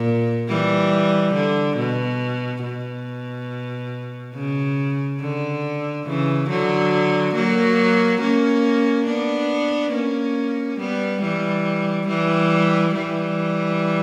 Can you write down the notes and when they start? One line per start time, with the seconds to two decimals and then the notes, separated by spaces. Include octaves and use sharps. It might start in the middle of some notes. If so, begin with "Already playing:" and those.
Already playing: A#2
0.48 E3 G3
1.34 D3
1.77 B2
2.63 B2
4.35 C#3
5.20 D3
6.06 C#3 E3
6.49 D3 F#3
7.35 F#3 A#3
8.21 A#3 C#4
9.07 B3 D4
9.93 A#3 C#4
10.79 G3 B3
11.22 E3 G3
12.07 E3 G3
12.94 E3 G3